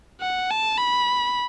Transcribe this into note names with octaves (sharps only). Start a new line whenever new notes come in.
F#5
A5
B5